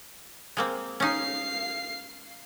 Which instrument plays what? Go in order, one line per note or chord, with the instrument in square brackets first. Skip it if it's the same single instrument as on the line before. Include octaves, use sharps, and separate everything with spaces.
[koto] G#3 A#3 C4
[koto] C#4 D#4 [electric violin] F5 C7